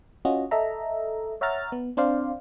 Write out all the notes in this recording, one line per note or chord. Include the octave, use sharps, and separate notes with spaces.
C#4 F4 F#4 D#5
A4 D#5 E5 A#5
C#5 E5 F#5 A#5 F6 A6
B3
C4 D4 C5 D5 F5